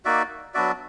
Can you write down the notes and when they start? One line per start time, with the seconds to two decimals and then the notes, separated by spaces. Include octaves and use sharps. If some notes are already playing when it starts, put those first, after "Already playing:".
0.05 A#3 D#4 F#4 D5 E5
0.54 F#3 B3 D4 F#4 D5 E5